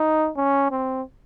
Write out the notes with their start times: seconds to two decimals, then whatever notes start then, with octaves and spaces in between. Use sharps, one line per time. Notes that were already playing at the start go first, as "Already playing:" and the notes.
Already playing: D#4
0.37 C#4
0.71 C4